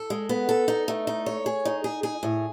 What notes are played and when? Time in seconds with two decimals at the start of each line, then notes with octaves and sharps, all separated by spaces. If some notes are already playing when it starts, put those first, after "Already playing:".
Already playing: A4
0.10 G#3
0.29 B3
0.49 A4
0.68 D#4
0.88 A3
1.07 D#4
1.26 C#5
1.46 G#4
1.65 D#4
1.84 G#4
2.03 G#4
2.23 A2